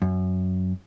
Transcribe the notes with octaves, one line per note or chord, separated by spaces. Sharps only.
F#2